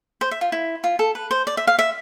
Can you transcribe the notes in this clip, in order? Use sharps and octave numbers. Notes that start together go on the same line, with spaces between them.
C5
E5
F4
E4
F4
A4
B4
C5
D5
E5
F5
E5